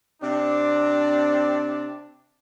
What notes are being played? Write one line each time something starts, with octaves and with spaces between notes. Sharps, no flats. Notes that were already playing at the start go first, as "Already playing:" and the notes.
C3 C4 D4